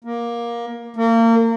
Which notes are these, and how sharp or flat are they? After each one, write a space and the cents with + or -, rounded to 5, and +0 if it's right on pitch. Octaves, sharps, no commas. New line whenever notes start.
A#3 +15
A#3 -30